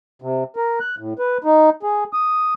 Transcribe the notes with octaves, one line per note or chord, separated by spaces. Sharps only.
C3
A#4
F#6
A2
B4
D#4
G#4
D#6